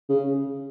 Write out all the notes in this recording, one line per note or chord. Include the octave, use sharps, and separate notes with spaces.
C#3